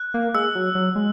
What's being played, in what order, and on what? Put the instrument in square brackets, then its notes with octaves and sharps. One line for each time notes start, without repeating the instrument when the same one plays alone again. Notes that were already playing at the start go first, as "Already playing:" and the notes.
Already playing: [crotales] F#6
[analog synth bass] A#3
[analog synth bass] G#3 [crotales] E6
[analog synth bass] F#3
F#3
G#3